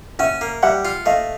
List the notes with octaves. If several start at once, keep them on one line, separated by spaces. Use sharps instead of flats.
C#4 E5 F#5
A#3
G3 E5 F#5
F4
A3 D#5 F5